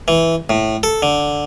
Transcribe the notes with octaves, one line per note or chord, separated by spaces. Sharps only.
E3
A2
A4
D3